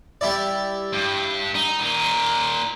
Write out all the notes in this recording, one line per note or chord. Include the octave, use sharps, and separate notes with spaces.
G3 E4 D5
G2
D#4
A#2 D#4